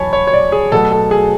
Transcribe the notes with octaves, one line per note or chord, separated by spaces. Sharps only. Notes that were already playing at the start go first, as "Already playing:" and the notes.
Already playing: E2 B2 F#3 C#5 G#5 A5 B5
C#5
C#5
D5
G#4
B2 F#3 A3 A4
A4
G#4